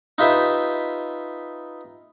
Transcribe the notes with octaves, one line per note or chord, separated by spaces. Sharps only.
D#4 F4 G4 B4 E5